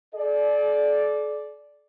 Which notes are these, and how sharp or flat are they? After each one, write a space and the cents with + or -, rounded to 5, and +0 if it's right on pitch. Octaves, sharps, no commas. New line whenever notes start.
A4 -45 D5 +0